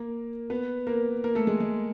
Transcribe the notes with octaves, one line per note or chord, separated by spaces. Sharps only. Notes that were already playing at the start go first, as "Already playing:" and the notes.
Already playing: A#3 A#4
B3 B4
A#3 A#4
A#3 A#4
A3 A4
G#3 G#4
G#3 G#4